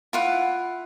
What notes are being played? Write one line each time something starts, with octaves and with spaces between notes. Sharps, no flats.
E4 F4 F#5